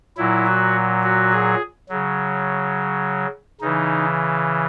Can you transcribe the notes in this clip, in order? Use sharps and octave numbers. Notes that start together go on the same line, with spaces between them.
A#2 F#3 E4
F#4
F#4
G#4
C#3 F#3
C#3 E3 D#4